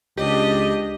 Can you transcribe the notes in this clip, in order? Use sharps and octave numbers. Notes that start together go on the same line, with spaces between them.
C#2 D4 G4 D#5